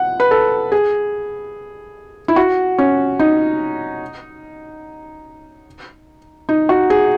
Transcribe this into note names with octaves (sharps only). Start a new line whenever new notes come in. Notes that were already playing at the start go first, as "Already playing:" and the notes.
Already playing: F#5
B4
A4
G#4
E4
F#4
C#4
D#4
D#4
F#4
G#4